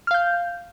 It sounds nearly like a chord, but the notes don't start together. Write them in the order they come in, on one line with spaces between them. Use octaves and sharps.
F6 F5 G6